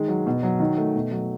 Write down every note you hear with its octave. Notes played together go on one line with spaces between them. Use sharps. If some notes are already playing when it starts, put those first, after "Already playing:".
Already playing: D#3 G#3
F#3
B2
F#3
D#3
A3
B2
F#3